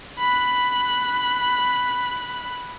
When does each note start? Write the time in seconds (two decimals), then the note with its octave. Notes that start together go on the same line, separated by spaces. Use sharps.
0.18 B5 F#6